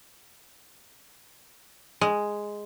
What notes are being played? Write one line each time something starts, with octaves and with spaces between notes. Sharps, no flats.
G#3